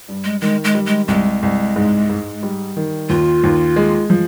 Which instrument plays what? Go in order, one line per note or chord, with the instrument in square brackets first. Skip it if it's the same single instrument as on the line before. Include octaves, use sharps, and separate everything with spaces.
[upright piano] G2
[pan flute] G#3
[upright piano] D#3 [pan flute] G#3
[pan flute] G#3
[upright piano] G3
[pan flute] G#3
[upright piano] C2 [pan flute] G#3
[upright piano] C2
G#2
G#2
G3
D#3
[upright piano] D#2 [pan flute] F4
[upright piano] D#2
G#3
F3